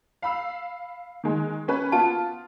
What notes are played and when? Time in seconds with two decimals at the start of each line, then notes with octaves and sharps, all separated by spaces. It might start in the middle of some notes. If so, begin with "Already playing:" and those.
0.22 F5 B5 E6
1.24 D#3 G#3
1.68 C#4 B4
1.92 B3 F4 A5